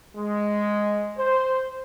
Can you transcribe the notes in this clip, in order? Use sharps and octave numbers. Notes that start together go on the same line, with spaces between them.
G#3
C5